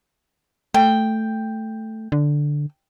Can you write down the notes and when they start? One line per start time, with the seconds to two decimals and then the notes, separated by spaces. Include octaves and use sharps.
0.74 A3 G5
2.12 D3